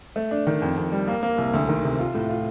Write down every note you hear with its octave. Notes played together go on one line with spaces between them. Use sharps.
A3
D4
D#3
F2
F2
G3
A#3
A#3
C2
D2
D#3
C3
F4
A2
F4